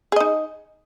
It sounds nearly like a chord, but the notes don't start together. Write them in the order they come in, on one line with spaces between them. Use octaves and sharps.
G#4 D#5 D#4